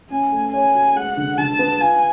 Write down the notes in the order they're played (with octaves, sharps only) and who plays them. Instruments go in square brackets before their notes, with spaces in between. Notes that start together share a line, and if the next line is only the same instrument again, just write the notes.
[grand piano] C#4 [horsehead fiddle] G#5
[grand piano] A3
[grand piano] C#5 [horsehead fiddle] G#5
[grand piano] F#4
[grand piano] G#3 [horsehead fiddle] F#5
[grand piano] D3
[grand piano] D3 [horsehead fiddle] A5
[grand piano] B3
[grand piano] F4 [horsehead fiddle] G#5